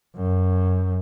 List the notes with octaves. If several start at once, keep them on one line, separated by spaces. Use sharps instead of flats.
F#2